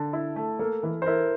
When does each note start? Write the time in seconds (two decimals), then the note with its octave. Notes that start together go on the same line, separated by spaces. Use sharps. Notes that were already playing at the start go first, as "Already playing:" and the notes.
Already playing: D3 A5
0.13 E4
0.36 A3
0.59 A#3 A4
0.83 E3 A4
1.02 C5
1.06 E4 A#4